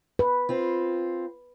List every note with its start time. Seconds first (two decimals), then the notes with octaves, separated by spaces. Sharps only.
0.19 B4
0.49 C4 F4